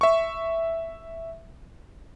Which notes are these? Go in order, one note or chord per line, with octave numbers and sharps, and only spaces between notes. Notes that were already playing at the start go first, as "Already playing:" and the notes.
E5 C#6